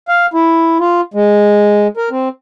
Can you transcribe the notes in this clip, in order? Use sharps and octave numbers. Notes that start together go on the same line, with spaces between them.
F5
E4
F4
G#3
A#4
C4